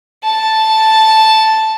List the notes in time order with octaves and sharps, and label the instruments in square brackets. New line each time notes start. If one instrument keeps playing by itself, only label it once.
[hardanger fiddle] A5